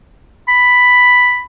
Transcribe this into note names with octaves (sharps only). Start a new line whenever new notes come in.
B5